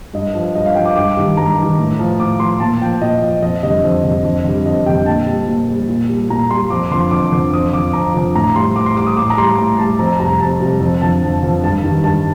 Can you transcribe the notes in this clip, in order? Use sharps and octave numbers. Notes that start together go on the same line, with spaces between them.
G2 D#5
F3
G2 D#5
F5
F3 G5
D6
G2 D6
D#3 G3
G2 A#5
D#3 G3
A2
F3
A2 D6
F3 C6
A#2 A5
F3 G5
A#2 D#5
F3
F2 D#5
D3 G3 D#5
F2
D3 G3
F2
D3 G3
F2 D#5
D3 G3 G5
A#2 A5
G3
A#2
G3
A#2
G3
A#2 A#5
G3 C6
F2 D6
D3 F3 C6
F2 D6
D3 F3
F2 D#6
D3 F3 D6
F2 A#5
D3 F3
A2 A#5
G3 C6
A2 D6
C6
G3 D6
D#6
A2 D6
A#5
G3 C6
A2 A#5
G3 A5
F2 A#5
C3 G3 A#5
F2 A5
C3 G3
F2
D3 F3 A5
F2
D3 F3
G2 A5
D#3 G3
G2 A5